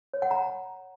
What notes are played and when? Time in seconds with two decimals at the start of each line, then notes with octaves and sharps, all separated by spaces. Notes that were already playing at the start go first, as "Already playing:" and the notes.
0.14 C#5
0.22 F#5
0.31 A#5